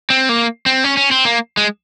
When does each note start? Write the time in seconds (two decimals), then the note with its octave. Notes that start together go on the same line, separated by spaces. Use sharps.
0.10 C4
0.29 A#3
0.66 C4
0.84 C#4
0.97 C#4
1.11 C4
1.25 A#3
1.57 G#3